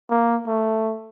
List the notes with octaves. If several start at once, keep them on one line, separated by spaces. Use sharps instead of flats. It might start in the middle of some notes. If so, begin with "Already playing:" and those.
A#3
A3